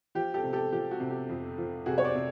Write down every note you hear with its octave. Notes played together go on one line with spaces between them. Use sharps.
F3 G4
G4 A4
C3
G4 A4
F3 G4
F#4
C3
G4
F2
F3
C3 F#4 G#4
C#5
C5 D5
C3